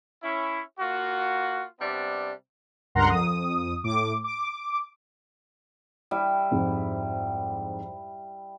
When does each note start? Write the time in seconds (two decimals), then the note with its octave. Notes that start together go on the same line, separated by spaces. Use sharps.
0.23 C#4 E4
0.80 A#3 F4 F#4
1.80 C3 G3 B3 D4
2.95 C#2 G2 A#4 F#5 A#5 C6
3.10 F2 D#6
3.84 A2 D6
4.24 D6
6.11 G3 E4
6.51 F2 G#2